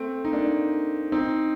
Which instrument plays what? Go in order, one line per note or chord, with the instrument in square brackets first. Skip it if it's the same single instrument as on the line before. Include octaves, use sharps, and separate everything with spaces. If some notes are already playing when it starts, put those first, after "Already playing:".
Already playing: [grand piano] A3 C4
D#4
A#3 D4
C4 D#4